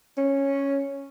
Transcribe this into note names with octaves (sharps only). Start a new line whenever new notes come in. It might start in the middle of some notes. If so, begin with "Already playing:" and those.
C#4